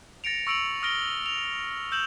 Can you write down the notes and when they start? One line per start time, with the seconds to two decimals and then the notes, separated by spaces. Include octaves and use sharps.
0.24 A6 A#6 C#7 D7 F7
0.47 C#6 E6 C#7 D7 F7 F#7
0.83 D#6 F6 A#6 D7 G7
1.26 F7
1.92 E6 G6 E7 F#7